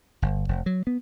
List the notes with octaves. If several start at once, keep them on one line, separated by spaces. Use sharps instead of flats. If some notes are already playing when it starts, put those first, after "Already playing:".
G1
F1
F#3
B3